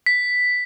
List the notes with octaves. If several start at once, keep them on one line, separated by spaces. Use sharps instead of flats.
B6